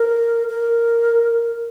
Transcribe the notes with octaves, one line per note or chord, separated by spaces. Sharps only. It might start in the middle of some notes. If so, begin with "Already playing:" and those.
Already playing: A#4
A#4